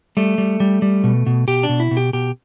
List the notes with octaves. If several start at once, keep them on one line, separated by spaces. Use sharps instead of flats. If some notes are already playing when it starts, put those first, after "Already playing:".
G3 A3
G3
G3
G3
B2
B2
B2 G4
D4
B2
E4
B2
G4
B2 G4